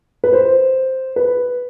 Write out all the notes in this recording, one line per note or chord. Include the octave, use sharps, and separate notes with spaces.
B4
C5
B4